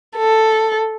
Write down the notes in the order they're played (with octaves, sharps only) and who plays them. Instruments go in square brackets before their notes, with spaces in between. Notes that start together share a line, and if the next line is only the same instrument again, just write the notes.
[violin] A4